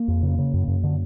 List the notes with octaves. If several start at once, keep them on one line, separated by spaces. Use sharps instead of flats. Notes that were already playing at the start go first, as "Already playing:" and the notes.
Already playing: A#3
F2
C#3
C#3
F#2
F#2
D3